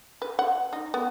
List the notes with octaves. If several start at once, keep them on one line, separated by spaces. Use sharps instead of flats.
B4
F#5
D#4
B3